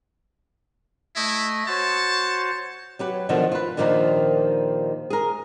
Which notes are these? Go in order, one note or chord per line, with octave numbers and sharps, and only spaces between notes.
A3 E4 D#5
F#4 C5 C#5 A5
F#3 G4 B4
B2 D3 D#3 F3
F4 B4
D#2 A#2 D#3 F3 A#3 D4
G#4 A#4